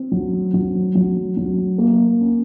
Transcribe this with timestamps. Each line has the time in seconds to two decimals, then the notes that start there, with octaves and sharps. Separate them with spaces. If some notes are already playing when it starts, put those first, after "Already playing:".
Already playing: C4
0.12 F#3
0.54 F#3
0.95 F#3
1.37 F#3
1.78 A#3
2.20 C#4